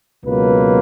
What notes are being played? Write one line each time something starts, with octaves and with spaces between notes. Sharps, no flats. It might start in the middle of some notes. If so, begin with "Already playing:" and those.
C#2 B2 F#3 A#3 B4